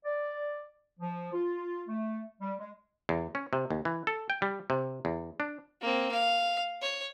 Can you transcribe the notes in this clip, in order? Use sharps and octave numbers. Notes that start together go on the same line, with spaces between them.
D5
F3
F4
A3
G3
G#3
E2
C#4
C3
D#2
E3
A4
G5
G3
C3
E2
D4
A#3 C4
F5
C#5